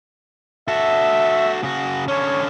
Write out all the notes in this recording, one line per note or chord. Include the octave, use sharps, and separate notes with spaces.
F#4 A4 E5
C#3 F#4
D3 C#4 C#5